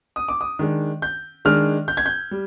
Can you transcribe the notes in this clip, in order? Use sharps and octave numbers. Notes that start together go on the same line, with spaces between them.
D#6
D6
D#6
D#3 G#3 D4
G6
D#3 G#3 D4 F6
G6
G#6
G6
G3